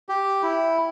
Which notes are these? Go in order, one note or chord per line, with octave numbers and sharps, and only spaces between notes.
G4
E4